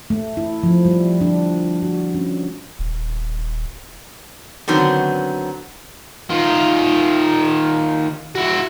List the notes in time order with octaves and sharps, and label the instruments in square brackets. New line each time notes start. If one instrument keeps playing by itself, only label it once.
[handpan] A3
E4
F3
G3
D4
F#4
C#4
[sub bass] D#1
[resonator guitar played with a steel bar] D3 D#3 F#3 B3 C4
[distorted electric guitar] D#3 F4
E4 F#4